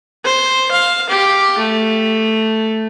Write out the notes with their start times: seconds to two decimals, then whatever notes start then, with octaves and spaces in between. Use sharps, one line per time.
0.24 C5
0.71 F5
1.09 G4
1.58 A3